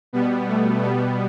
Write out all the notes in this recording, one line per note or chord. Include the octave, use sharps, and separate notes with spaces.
B2 G3 B3
A3
B2 G3 B3